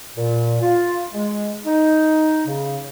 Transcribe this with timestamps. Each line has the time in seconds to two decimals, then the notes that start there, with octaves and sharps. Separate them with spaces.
0.16 A#2
0.62 F4
1.13 G#3
1.65 D#4
2.46 C#3